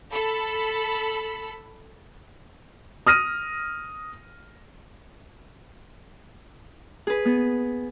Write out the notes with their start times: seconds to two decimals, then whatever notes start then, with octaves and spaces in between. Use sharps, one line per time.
0.14 A4 B5
3.07 D#6 F6 A#6 D#7
7.07 G#4 B4
7.25 B3